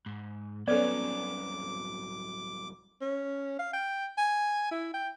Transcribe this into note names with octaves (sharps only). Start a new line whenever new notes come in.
G#2
C2 F#3 B3 C#4 A4 B4 D5 D6
C#4
F5
G5
G#5
E4
G5